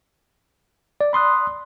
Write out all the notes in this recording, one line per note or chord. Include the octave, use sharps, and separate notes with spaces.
D5
B5 C6 D#6 F#6